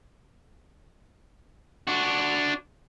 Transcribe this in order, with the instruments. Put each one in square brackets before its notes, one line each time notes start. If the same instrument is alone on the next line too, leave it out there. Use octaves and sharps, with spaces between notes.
[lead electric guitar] D4 F#4